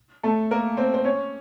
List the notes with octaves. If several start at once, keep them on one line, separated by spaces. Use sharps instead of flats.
A3 A4
A#3 A#4
C4 C5
C5
C#4 C#5